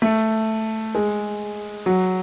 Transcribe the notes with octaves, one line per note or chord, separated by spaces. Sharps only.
A3
G#3
F#3